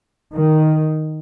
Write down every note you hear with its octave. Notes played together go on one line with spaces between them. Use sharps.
D#3